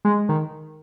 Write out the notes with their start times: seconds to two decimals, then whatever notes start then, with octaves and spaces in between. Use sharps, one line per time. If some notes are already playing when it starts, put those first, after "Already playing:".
0.05 G#3
0.29 D#3